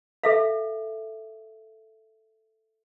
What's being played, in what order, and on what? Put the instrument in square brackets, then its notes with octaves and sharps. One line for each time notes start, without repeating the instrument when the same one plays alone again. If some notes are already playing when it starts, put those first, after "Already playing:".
[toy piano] A4 E5 F5